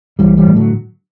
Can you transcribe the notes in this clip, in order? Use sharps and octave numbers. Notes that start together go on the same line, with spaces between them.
B1 E3 G3
E3 G3
A2
D3 F#3